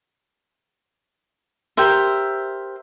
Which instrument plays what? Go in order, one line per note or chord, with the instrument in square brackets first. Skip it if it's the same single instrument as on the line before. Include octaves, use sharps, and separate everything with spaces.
[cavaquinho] G4 A#4 C5 E5